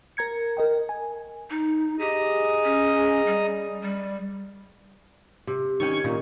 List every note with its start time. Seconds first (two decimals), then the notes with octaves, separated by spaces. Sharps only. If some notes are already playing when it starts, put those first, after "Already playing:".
0.17 A#4 A#5 G#6 C#7
0.57 A#4 D#5 G5
0.89 G#5
1.50 D#4
2.00 G4 G#4 D#5 A#5 D#6
2.65 C#4
3.27 G3
3.82 G3
5.47 C3
5.80 D#3 C#4 G5 C#6
5.91 C#6 G#6
6.04 A#2 D#3